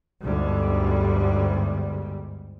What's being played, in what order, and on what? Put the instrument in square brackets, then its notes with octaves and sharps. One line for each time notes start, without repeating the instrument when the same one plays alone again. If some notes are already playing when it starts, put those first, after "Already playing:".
[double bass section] G1 D2 G#2 G3